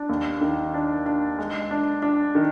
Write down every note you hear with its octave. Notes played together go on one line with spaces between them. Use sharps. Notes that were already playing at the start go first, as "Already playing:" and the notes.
Already playing: D4
D#2
D#3
D4
D4
G#3
D4
D4
D#3